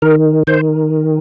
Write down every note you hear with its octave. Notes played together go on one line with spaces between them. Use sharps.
D#3 A#4
D#3 C5